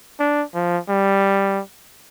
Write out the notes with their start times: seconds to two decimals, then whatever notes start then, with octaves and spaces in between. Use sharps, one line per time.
0.19 D4
0.54 F3
0.89 G3